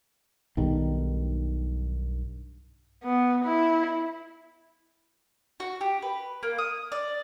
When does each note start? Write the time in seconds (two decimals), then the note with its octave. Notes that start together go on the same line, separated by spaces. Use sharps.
0.57 B1 G2 D#3 G3
3.04 B3
3.45 E4
5.60 F#4
5.81 G4
6.02 B4
6.43 A#3
6.58 D#6
6.92 D5